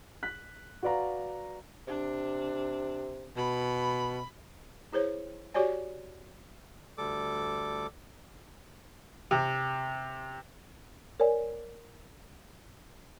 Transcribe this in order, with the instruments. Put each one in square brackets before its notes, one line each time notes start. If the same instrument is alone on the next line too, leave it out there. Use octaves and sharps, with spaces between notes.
[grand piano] F#6 B6
F#4 B4 D5 F5 A#5
[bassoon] C3 [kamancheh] D4
[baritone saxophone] B2 [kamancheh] B5
[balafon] E4 G#4 C5 C#5
F#4 G4 C#5 D5 G#5
[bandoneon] D2 G3 A4 D6
[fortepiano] C3
[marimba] A#4 C#5 D5 G#5